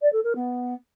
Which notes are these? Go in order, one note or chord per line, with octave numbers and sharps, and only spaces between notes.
D5
A4
A#4
B3